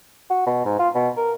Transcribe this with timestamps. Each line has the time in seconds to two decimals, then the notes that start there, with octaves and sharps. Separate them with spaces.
0.30 F#4
0.46 B2
0.65 G#2
0.79 F4
0.95 B2
1.17 A#4